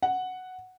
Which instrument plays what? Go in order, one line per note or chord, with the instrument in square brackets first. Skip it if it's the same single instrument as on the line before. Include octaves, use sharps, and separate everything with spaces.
[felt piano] F#5